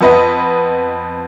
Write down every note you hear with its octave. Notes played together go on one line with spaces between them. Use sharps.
F2 B3 B4 D#5